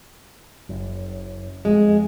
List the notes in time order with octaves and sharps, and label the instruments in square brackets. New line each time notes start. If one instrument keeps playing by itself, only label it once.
[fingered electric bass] F#1 F#2
[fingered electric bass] F2 [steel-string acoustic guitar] G#3